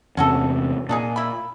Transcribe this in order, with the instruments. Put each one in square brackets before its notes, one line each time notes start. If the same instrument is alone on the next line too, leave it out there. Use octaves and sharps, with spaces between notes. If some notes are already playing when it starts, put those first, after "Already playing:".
[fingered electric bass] E2 C3 [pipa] C#4 F#4 A4
[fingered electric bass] A#2 [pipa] D4 D#4 G#4
[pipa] E4 B5